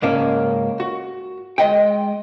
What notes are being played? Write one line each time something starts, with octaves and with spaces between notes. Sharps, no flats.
C#2 G#2 A#3 C#4 D5 A5
F#4
G#3 D#5 G5